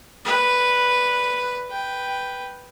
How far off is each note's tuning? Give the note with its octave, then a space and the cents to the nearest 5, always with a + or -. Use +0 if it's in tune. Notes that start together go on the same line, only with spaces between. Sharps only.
B4 +0 D5 +0
B4 +0 G5 +0